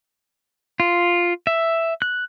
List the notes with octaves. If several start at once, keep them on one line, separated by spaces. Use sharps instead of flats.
F4
E5
F#6